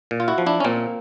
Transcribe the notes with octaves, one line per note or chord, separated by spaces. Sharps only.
A#2
F4
E4 F#4
F3
D4 E4
C#4
A#2 A#3 C4